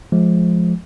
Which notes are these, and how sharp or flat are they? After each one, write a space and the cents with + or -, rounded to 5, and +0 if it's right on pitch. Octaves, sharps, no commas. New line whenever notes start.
F3 +0 G#3 +20